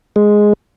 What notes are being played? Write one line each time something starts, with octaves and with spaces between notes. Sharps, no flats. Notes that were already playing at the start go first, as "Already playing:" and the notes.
G#3